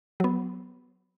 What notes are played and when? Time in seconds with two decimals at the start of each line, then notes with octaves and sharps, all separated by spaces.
0.20 F#3 B3